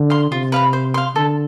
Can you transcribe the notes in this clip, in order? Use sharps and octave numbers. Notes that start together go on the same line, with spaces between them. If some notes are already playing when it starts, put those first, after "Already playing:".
Already playing: D3
F5 C6
C3 F4
B4 F5 B5
C5
F5 C6
D3 A4